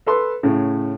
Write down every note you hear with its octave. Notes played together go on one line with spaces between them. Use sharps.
A4 B4 C6
A2 C#3